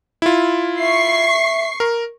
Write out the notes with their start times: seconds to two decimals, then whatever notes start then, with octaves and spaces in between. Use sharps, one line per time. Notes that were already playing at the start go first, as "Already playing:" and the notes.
0.22 E4 F4
0.78 E5 C#6 C7
1.80 A#4